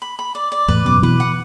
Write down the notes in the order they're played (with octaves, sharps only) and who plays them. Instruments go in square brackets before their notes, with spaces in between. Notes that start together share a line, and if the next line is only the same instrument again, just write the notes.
[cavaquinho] B5
B5
D5
D5
[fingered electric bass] E2 A2 [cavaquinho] B4
[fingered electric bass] F#2 B2 [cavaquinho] D6
[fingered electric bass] B2 E3 [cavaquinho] B4
[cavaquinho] F#5